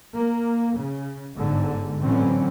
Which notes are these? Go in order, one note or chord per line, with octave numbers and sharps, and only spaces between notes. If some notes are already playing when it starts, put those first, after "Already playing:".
A#3
C#3
G1 G#2 D3
A2 D3 E3 F#3 C4 C#4